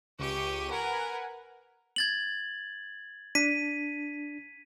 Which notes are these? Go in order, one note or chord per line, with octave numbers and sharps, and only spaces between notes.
C#2 G4 C#6 D#7
A#4 B4 F#5 G#5
G#6 A6 F#7
D4 B6 D#7